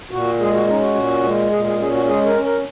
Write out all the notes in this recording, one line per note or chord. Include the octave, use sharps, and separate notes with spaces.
A#2 F#4
G#3 G#4
F#4
C#4 D#4
F#4
A#2
G#3
A#2 G#4
G#4
C#4 G#4
F#4
G#3 G#4
A#4
C#4
A#4